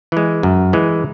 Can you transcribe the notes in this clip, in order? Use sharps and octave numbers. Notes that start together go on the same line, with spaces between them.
E3 G#3
F#2
E3 G#3